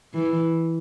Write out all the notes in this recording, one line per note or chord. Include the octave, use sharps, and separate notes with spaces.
E3